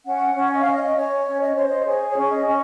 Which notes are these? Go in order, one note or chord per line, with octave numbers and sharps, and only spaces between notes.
C#4 F#5
C#4
D#5
F5
C#4
D#5
C#4 C#5
C#4
D#5
C5 C#5
D#5
G#4 C#5
C#5
C#4
C#5
D#5
C#4